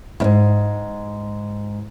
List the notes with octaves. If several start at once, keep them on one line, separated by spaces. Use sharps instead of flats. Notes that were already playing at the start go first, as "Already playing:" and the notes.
E2 G#2